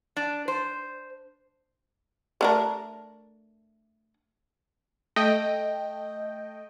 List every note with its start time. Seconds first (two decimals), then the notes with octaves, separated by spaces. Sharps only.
0.16 D4
0.48 C5
2.41 A3 D4 A#4
5.16 A3 D#5 G5